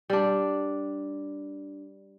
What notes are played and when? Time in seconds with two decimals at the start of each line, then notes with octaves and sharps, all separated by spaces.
0.10 G3 D4